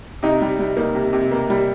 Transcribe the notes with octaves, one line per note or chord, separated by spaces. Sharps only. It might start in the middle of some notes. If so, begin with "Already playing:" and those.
C3 D#4
G3
G3
A#3 D#4
C3
C3
A#3
G3